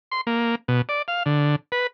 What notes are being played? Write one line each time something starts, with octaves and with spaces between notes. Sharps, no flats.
C6
A#3
B2
D5
F5
D3
B4